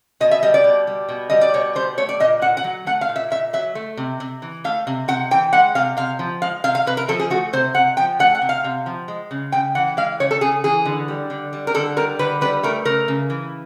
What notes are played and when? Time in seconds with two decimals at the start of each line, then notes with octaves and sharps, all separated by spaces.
0.20 B2 D#5
0.31 E5
0.43 G3 D#5
0.54 D5
0.64 B2
0.87 G3
1.09 B2
1.30 G3 D#5
1.41 D5
1.54 B2 C#5
1.75 G3 C5
1.98 A3 C#5
2.09 D5
2.20 A#2 D#5
2.42 A#2 F#5
2.57 F#5
2.64 F#3
2.86 A3 F#5
3.01 F5
3.09 A#2
3.16 E5
3.30 A#2 E5
3.53 F#3 E5
3.75 A3
3.97 C3
4.20 C3
4.42 E3
4.64 A3 F5
4.87 C3
5.08 C3 F#5
5.31 E3 G5
5.52 G#3 F#5
5.75 C3 F5
5.97 C3 F5
6.19 F3
6.42 G#3 F5
6.64 C3 F5
6.75 F5
6.87 C3 B4
6.97 A#4
7.08 F3 A4
7.20 G#4
7.30 A3 F#4
7.53 C3 C5
7.75 C3 F#5
7.97 F3 G5
8.19 A3 F#5
8.35 F#5
8.42 C3
8.49 F5
8.64 C3
8.86 F3
9.08 G#3
9.31 C#3
9.52 C#3 G5
9.75 E3 F#5
9.97 G#3 F5
10.20 C#3 C#5
10.31 A4
10.41 C#3 G#4
10.64 E3 G#4
10.85 D3
11.08 G3
11.30 D3
11.53 G3
11.67 A#4
11.74 D3 A4
11.97 G3 A#4
12.19 D3 B4
12.41 G3 B4
12.63 A3 A#4
12.85 C#3 A#4
13.08 C#3
13.30 E3